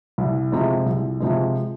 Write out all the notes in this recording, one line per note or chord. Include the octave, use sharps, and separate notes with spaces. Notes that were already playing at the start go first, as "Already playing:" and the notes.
C2
C3 F3 G#3
C2
C3 F3 G#3